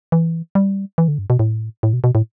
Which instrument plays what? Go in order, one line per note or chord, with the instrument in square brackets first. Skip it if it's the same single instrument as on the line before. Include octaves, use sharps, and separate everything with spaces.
[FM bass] E3
G3
E3
D3
G2
B2
A2
A2
B2
B2
A2